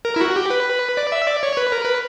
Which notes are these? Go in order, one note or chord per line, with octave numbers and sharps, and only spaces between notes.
A#4
E4
F#4
G4
B4
D5
E5
D5
C#5
B4
A#4
B4